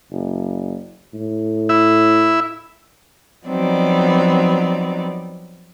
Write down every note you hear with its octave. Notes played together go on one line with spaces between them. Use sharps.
F#1
A2
E4 E5
F3 F#3 B3 C4 D#4 D5